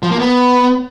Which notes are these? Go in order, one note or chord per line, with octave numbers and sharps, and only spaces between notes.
F3
A#3
B3